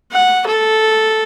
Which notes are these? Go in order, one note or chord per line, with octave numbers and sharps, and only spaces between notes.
F#5
A4